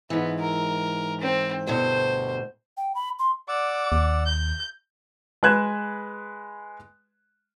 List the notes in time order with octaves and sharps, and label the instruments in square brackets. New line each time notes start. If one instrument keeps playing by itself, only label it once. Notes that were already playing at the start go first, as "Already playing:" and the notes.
[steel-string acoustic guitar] G#2 E3 [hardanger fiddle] B3
[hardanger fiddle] A#4
C4
[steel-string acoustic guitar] D2 G2 B2 [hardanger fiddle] C5
[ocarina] G5
B5
C6
[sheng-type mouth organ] D5 F#5 E6 [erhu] D6
[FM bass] D#2
[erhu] G6
[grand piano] G#3 B4 F#6 G#6 E7